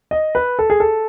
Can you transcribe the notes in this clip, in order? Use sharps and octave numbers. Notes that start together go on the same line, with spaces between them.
D#5
B4
A4
G#4
A4